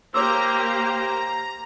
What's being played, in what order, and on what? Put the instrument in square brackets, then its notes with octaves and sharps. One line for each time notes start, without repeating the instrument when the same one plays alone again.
[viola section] A#3 G4 [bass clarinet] C5 [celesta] C#5 D6 E6 [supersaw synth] A#5